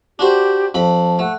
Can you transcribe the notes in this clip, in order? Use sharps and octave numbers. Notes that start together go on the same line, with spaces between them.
D4 F#4 G4 C5
F2 A5 B5
A3 F#5